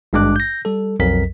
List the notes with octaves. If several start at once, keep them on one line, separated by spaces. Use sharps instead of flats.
G#1 G2 G#3 D4 D6 F#6
G6 A#6
G3 A4
B1 F2 F#3 A#4 B6